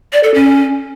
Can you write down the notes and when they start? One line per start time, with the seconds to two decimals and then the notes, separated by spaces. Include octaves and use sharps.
0.13 D5
0.24 A4
0.34 C#4